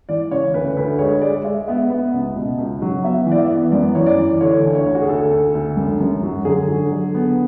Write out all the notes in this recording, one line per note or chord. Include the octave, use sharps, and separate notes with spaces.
E3 D5
C#3 C#5
D2 B4
D2 B4
G#3 C#5
G#3 D5
G#3 E5
B3 E5
B3
C#2
B2
C#2
F#3
B3 E5
E3
D5
E5
B3
F#2 D5
E3 C#5
D5
E3
D3 C#5
D2
C#5
D2
F#4
G#4
D2 A4
D2
D2
F#2
F#2
F#3
D3 G#4
F#3
D3
B3